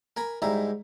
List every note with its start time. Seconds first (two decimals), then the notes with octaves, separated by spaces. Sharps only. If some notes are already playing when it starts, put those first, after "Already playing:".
0.17 A#4 G#5 A#5 B5
0.42 G#2 G3 E4 A#5